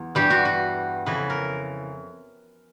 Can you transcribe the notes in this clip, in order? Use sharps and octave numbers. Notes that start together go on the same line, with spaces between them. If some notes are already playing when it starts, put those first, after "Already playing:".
Already playing: E2
G2 E3 G3 G4
F#4
F#4
F2 C#3 E3 B4
A#4